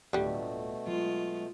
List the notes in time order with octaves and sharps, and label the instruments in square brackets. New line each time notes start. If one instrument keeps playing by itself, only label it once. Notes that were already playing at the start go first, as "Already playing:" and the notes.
[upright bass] D1 F4 [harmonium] B2 A3 [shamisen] D3 G3
[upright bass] F#3 [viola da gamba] G#3 F4